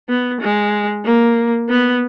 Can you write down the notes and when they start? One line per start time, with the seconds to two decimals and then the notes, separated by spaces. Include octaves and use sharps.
0.09 B3
0.41 G#3
1.05 A#3
1.69 B3